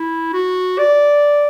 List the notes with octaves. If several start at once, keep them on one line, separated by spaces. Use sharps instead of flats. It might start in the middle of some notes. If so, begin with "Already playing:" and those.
Already playing: E4
F#4
D5